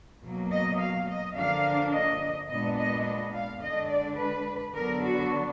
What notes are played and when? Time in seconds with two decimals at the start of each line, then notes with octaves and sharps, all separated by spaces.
0.22 B2 F#3 A#3
0.51 D#5
0.79 F5
1.08 D#5
1.36 D3 F3 A#3 D4 F5
1.92 D#5
2.49 A#2 G#3 B3 D4 D#5
2.77 D#5
3.05 D#5
3.34 F5
3.61 D3 G#3 D4 D#5
3.89 D5
4.18 B4
4.74 D3 F#3 B3 D4 A#4
5.02 F#4